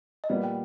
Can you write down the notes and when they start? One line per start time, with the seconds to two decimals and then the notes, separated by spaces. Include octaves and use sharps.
0.24 D#5
0.29 A#2 G3 B3 D5
0.43 G5